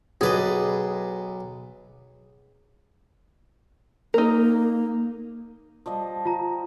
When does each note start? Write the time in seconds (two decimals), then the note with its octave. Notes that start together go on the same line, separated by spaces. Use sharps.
0.21 B1 G#4 B4 D5 D#5
4.14 A#3 D#4 A#4
5.86 F3 G3 D#5
6.25 F4 A#5